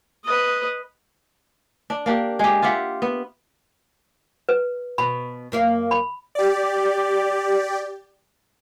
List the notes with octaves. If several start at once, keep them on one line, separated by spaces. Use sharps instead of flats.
B4 D#5
D4
A#3 D4 G4
G#3 G4
F4 G4 E5 F#5
B3
B4
B2 B5
F#2 A#3 F5
B5
G4 D5